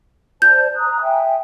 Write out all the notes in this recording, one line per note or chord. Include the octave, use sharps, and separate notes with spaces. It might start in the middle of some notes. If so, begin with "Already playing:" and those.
C5 D5 A5 G6
A#5 D#6 F#6
E5 G5 G#5